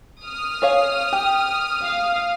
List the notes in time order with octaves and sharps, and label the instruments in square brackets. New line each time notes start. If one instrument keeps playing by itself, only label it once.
[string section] D#6 F6
[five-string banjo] G#4 C#5 F5
G4
[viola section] F5